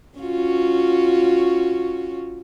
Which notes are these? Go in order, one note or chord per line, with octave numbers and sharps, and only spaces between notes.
C#4 F4 F#4